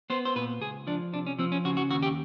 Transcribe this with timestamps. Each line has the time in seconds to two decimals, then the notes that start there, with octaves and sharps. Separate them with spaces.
0.10 B3 C5
0.25 C5
0.36 A#2 B4
0.61 C#2 G#4
0.87 F3 D4
1.13 C3 D4
1.27 C#4
1.39 F3 C4
1.52 C#4
1.65 C#3 F#4
1.77 F#4
1.89 D#2 F#4
2.03 G4